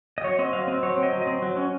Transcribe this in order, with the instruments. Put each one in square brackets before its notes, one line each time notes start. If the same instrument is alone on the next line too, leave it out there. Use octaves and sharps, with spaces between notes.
[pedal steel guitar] D#5
F#3 C#5
C4 D#5
F#3 F5
C4 D#5
F#3 C#5
C4
D#5
F#3
D#5
C4
F#3
C#4